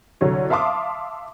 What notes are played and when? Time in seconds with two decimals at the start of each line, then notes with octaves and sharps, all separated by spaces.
0.21 C2 D3 F#3 C#5
0.50 E5 F5 A5 C6 D6 D#6